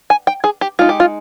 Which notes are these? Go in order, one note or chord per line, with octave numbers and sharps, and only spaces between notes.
G#5
G5
G#4
G4
G#3 D#4 F4
G4
F4